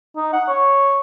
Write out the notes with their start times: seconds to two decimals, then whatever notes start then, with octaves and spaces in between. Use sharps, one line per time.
0.16 D#4
0.33 F#5
0.48 C#5